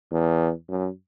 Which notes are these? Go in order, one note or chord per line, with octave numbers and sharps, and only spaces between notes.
E2
F#2